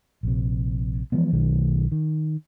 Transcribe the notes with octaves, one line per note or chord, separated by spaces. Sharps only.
A#1 C3
E3 F3 G#3 B3
B1 D#3 A3
D#3